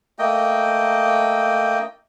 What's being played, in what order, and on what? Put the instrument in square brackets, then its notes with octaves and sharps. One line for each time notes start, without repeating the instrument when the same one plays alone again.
[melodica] A3 A#3 D#5 G5